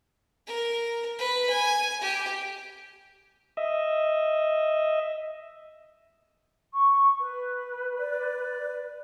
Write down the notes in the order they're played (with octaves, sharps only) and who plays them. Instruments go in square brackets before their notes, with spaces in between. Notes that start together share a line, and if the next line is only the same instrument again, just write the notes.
[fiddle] A#4
B4
G#5
G4
[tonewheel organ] D#5 E5
[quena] C#6
B4
[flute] D5